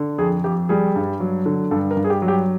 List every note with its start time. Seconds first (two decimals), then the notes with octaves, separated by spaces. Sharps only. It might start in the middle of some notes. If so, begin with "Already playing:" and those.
Already playing: D3
0.18 F2 G#4
0.44 F2 G4
0.69 G3 G#4
0.96 G2
1.20 F#3
1.46 D3
1.71 G2 A4
1.91 A#4
1.97 G2
2.04 G#4
2.10 G4
2.22 F#3
2.28 G4